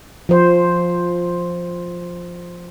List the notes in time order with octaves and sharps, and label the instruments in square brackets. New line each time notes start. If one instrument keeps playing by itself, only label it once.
[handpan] F3 C5